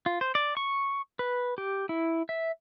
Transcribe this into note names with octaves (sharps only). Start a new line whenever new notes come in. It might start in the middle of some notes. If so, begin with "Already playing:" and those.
F4
C5
D5
C#6
B4
G4
E4
E5